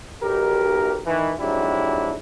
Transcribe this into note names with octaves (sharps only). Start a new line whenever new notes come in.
B1 G4 A#4
D#3 E3
F2 G#2 F#3 D4 E4 G4